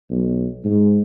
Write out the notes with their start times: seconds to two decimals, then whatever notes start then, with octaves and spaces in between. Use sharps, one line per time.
0.10 B1
0.64 G#2